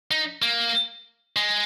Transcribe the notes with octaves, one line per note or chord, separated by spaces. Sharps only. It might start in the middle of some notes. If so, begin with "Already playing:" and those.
D#4
A#3
G#3